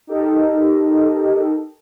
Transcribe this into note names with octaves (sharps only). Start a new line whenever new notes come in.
D#4 G4 A4 A#4 D#5